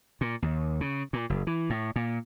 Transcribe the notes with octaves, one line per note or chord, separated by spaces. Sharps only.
A#2
D#2
C#3
A#2
F#1
E3
A2
A#2